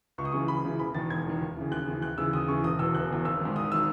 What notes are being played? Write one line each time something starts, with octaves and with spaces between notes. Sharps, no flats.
C#2 C#6
D#6
C#3 E3 C#6
C#2 B5
C#3 E3
E1 B5
E2 D#3 A6
E1 G#6
E2 D#3
D#2
C#3 E3
D#2 F#6
C#3 E3
D#2 F#6
C#3 E3 E6
D#2 D#6
C#3 E3 C#6
E1 D#6
E2 B2 E6
E1 F#6
E2 B2
G#1 E6
G#2 D#3
G#1 D#6
D#3 E6